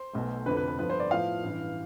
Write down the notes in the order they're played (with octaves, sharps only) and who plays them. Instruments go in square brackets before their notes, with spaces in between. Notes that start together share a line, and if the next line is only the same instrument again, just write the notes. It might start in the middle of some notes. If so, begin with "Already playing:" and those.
Already playing: [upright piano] C5
B1 B2 A3
F1 F2 D3 B4
B4
B4
G2 F3 B3 F4 B4
C5
D5
A2 F3 B3 F5
A1 G2 E3